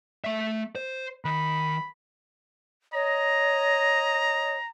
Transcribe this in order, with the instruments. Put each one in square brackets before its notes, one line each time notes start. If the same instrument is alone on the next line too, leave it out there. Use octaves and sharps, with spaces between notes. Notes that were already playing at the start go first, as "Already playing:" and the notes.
[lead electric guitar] A3 E5
C5
[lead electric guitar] D#3 [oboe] B5
[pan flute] C#5 [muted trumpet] D#5 [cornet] A#5